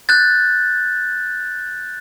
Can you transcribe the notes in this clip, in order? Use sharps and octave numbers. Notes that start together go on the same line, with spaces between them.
F#6 G6 A6